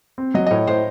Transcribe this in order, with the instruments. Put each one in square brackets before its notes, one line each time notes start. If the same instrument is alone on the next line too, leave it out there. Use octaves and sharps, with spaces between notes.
[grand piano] C4
[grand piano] F#3 [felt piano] D#5
[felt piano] D#5
[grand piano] A2 [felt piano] C#5
[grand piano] A2 [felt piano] C5